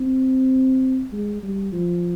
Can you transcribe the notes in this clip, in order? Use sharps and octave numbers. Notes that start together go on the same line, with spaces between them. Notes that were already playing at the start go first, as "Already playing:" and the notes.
Already playing: C4
G#3
G3
F3